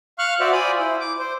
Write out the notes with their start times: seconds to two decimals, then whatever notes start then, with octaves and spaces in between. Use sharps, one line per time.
0.19 F5 C#6 F6 F#6
0.40 F#4 C5 D5 E5
0.52 F4 C5 D5 G#5 B5 D#6
0.79 E4 C5
1.00 D6
1.19 C5